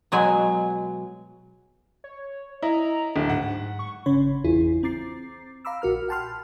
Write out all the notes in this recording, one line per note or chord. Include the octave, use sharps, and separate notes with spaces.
B2 F#3 G#3 G#5
C#5
E4 D#5 A#5
D1 D4
G#2 F#5
C#6
G1 C#3 C#4 C#5 B5 C6
G1 E2 E4 F4 G#4
C4 A#5 D6 A6 C7
F5 A#5 B5 D6 E6
A#1 F#4 A#4 F6
F#5 G5 A5 B5 C6 F6